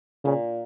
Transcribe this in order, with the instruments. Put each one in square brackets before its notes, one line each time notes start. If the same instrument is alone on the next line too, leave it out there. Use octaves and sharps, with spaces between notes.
[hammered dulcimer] A#2 [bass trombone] C#3